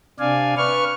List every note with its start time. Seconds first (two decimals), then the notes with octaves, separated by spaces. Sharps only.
0.19 C3 D4 D5 F5 G#5
0.57 B4 C#6 F6